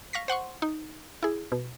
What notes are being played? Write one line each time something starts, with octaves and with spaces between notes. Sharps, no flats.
F5 C#6 A#6 B6
C5 F#5 C6 C#6
D#4
E4 G#4
B2